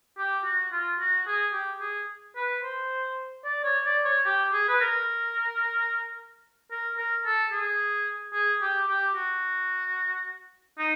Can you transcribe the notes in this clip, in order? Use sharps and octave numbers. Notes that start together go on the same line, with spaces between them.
G4
F#4
F4
F#4
G#4
G4
G#4
B4
C5
D5
C#5
D5
C#5
G4
G#4
B4
A#4
A#4
A#4
A4
G#4
G#4
G4
G4
F#4
D#4